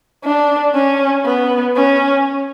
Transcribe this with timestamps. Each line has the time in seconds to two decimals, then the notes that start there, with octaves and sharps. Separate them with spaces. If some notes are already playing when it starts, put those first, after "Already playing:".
0.24 D4
0.74 C#4
1.25 B3
1.76 C#4